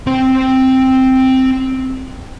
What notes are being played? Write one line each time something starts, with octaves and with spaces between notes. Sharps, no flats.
C4 G5